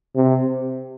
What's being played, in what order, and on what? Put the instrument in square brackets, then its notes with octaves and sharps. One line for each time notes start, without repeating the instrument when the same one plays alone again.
[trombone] C3